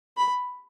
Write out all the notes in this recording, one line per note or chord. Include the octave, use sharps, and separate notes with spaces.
B5